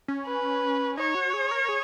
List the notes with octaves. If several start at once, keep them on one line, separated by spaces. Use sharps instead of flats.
C#4
B4
D#4 C#5
F#4
G#4
A#4
G#4